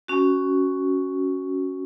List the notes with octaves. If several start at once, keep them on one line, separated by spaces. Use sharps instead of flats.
C#4 F#4